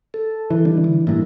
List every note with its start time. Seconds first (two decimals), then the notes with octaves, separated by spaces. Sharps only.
0.14 A4
0.50 E3
0.65 D#3 G3 D4
0.84 D3
1.07 A1 G2 A#3 E4